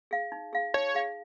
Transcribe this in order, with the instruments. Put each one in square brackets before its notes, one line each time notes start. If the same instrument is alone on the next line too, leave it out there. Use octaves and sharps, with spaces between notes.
[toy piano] G#4 F5
D#4
G#4 F5
[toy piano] D#4 [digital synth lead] C#5
[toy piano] G#4 F5